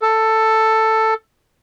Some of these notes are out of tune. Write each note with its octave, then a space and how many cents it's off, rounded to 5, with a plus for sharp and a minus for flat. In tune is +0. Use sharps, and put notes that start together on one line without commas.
A4 +10